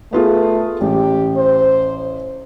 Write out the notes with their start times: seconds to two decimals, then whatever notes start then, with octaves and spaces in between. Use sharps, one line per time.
0.13 A3 B3 F4 G#4
0.81 A1 G4
1.37 C5